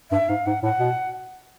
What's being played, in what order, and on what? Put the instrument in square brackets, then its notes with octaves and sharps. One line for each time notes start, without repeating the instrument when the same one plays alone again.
[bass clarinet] G2 [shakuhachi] E5
[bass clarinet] G#2 [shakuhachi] F5
[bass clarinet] G#2 [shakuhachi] F#5
[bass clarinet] A2 [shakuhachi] F#5
[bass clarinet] B2